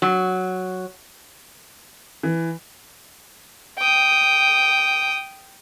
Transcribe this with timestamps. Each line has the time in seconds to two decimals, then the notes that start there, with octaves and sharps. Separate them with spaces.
0.02 F#3
2.23 E3
3.79 G5 D#6